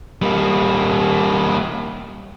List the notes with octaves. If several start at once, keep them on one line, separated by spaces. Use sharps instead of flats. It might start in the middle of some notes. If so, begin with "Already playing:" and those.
G3 A#3